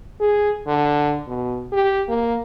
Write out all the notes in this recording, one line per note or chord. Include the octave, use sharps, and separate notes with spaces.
G#4
D3
B2
G4
A#3